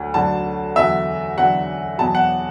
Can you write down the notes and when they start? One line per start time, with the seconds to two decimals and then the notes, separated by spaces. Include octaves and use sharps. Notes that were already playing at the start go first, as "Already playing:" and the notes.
Already playing: D2 D3 F#3
0.14 D2 D3 F#3 A5
0.76 E2 D3 F#3 E5
1.37 E2 D3 F#3 F#5
1.99 E2 B2 F#3 A5
2.15 F#5